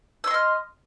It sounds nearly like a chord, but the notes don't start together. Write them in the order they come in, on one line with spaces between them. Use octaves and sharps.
E6 C6 D#5 F6